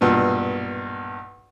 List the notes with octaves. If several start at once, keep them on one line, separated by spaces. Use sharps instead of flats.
B1 G2 A#2